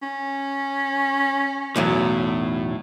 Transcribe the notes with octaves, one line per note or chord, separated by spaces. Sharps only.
C#4
B1 E2 A2 F#3